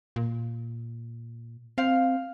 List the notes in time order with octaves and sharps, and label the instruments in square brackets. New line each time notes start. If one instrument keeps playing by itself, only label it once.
[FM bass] A#2
[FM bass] C4 [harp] F5